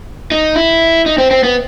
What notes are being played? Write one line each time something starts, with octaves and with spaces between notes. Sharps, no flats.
D#4
E4
D#4
C4
C4
B3